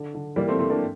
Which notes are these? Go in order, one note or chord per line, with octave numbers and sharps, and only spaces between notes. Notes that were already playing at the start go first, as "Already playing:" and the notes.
Already playing: D3
D3
E3 G3 A#3
A3 C4
E3 A3 C4
A#3 D4